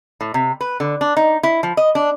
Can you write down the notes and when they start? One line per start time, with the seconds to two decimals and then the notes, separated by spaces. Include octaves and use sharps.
0.21 A2
0.34 C3
0.61 B4
0.80 D3
1.01 D4
1.17 D#4
1.43 E4
1.63 F3
1.77 D#5
1.95 D4